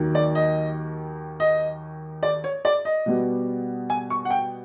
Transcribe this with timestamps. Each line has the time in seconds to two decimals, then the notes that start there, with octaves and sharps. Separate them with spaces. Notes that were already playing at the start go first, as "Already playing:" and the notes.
Already playing: D#2 D#3 F#3 A#3
0.15 D5
0.35 D#5
1.40 D#5
2.23 D5
2.44 C#5
2.65 D5
2.85 D#5
3.06 B2 G3 B3
3.90 G#5
4.10 C#6
4.25 F#5
4.30 G5